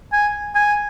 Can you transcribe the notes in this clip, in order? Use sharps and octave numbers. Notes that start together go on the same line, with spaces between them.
G#5
G#5